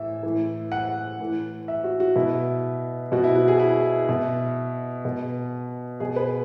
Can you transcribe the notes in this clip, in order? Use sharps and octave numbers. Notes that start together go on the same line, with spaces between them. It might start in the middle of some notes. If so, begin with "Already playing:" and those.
Already playing: A2 E3 E5
A2 E3
F#5
A2 E3
E5
F#4
F#4
B2 E4
B2 F#4
E4
F#4
G#4
E4
B2
B2
B2 G#4
B4